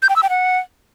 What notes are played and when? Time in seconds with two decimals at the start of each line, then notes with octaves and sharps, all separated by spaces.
0.03 G6
0.09 G5
0.16 E6
0.23 G5
0.30 F#5